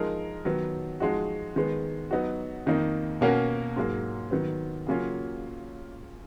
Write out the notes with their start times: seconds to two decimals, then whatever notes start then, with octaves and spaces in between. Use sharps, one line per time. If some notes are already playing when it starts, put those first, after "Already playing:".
Already playing: F3 G#3 D#4 A#4
0.45 D#3 F#3 B3
1.00 F3 G#3 D#4 F#4
1.56 D#3 G#3 B3
2.11 F#3 B3 D#4 F#4
2.66 F2 D#3 A#3 D#4
3.21 B2 A#3 C#4 F#4 A#4
3.76 G#2 F#3 A#3
4.31 D#3 F#3 B3
4.87 C#3 F#3 A#3 C#4 F4